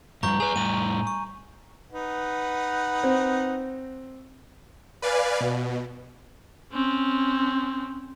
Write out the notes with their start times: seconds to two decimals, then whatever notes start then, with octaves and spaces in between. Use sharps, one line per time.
0.23 G2 F3 G3 A#5 C#6 G6
0.40 G#4 B4 G#5
0.56 A2 G3 G#5 D#7
1.07 C#6
1.92 D#4 B4 F#5
3.03 C4
5.02 B4 D5 F5 G#5
5.40 B2
6.72 C4 C#4